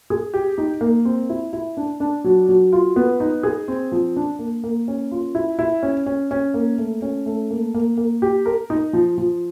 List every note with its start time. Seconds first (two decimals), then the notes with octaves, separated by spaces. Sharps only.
0.10 G#4
0.34 G4
0.58 D#4
0.81 A#3
1.05 C4
1.29 E4
1.53 E4
1.77 D4
2.00 D4
2.24 F#3
2.49 F#3
2.73 F4
2.96 B3
3.20 D#4
3.43 G#4
3.68 C4
3.92 F3
4.16 D4
4.39 A#3
4.64 A#3
4.88 C#4
5.11 F4
5.35 E4
5.59 E4
5.83 C#4
6.06 C#4
6.31 C#4
6.54 A#3
6.78 A3
7.02 C#4
7.26 A3
7.50 A#3
7.74 A#3
7.98 A#3
8.22 G4
8.46 A#4
8.70 D#4
8.93 F3
9.18 F3